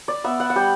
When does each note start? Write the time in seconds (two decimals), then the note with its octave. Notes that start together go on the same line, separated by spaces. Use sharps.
0.08 D5
0.24 B3 E5
0.40 F#5
0.50 F#5
0.56 G3 G5